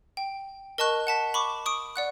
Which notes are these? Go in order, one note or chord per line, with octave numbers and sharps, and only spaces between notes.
G5
A#4 D#5 A5 C#6 F#6
F#5 A5 B6
B5 C#6 D6
C#6 D#6 D7
D5 F#5 F#6